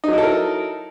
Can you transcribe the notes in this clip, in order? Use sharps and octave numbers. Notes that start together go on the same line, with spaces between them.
F#3 D#4 E4 A4 A#4